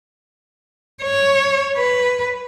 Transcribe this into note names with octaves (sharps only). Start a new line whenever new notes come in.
C#5
B4